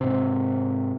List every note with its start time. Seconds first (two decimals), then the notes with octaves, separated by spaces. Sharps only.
0.01 G#2 C3